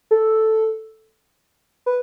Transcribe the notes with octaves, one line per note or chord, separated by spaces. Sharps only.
A4
B4